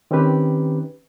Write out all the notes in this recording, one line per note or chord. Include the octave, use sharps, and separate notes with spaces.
D#3 C4 C#4 D#4 G4 B4